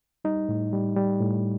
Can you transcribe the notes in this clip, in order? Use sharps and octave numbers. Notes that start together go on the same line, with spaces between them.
G3 D#4
A2
G3
G3
A2